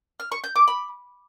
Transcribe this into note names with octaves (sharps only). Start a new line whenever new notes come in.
F6
C#6
G6
D6
B5